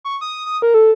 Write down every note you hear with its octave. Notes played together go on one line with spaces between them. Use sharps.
C#6
D#6
D#6
A#4
A4